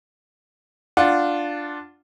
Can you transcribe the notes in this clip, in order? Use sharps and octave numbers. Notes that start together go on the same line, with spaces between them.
D4 F4 F#5